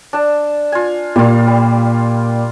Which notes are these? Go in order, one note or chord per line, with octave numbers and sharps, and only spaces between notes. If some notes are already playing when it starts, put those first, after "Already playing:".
D4 A5
F4 G#5
A#2 G3 F4
G3